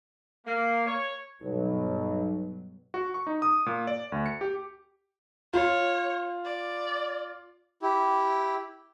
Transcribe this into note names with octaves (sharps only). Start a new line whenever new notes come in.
A#3
C#5
B1 G2 B2 F#3
F#4
C#6
D#4
D#6
A#2
D5
D2
C#7
G4
F4 C#5
D5
E4 G4